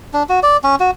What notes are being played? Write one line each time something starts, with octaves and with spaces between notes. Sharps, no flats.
D4
F#4
D5
C#4
F#4